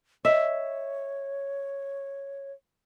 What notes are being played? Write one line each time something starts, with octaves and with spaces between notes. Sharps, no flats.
C#5 D#5 E5